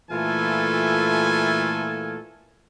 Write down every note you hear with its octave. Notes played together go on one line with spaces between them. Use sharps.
A#2 E3 A3 F4 A4 G#5